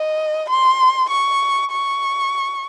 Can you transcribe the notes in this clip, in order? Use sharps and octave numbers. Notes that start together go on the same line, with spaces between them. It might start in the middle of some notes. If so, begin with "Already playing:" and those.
Already playing: D#5
C6
C#6
C#6